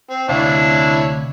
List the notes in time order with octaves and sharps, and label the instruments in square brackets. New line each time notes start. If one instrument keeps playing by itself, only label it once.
[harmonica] C4
[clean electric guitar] D2 C3 F5 [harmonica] D4 E4 C#5